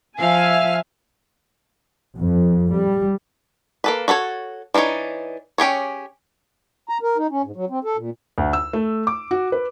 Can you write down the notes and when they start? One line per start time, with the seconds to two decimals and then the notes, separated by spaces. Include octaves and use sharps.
0.18 F3 E5 F5 G#5 F6
2.19 F2
2.72 G3
3.84 A#3 A4 B4
4.08 F#4 A4 B4 C#5
4.74 E3 G3 D4 D#4 C#5
5.58 C#4 G4 G#4 C#5
6.89 A#5
7.03 A#4
7.18 D#4
7.31 C#4
7.44 G#2
7.56 F#3
7.70 C4
7.85 A4
7.97 A#2
8.38 D2
8.53 E6
8.73 A3
9.07 D6
9.31 F#4
9.52 B4